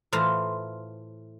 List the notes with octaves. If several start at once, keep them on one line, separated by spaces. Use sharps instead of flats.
A2 E3 F4 C5 A#5 C6